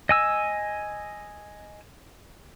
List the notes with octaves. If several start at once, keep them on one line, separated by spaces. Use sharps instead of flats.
D#5 G#5 E6